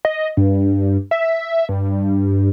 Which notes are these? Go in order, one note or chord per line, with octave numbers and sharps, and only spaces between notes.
D#5
G2
E5
G2